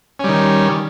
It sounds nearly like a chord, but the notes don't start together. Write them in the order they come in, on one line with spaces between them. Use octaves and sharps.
C#4 G3 D#3